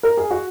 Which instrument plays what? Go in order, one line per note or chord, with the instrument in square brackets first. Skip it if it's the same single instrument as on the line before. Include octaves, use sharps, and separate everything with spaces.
[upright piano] A#4
G#4
F#4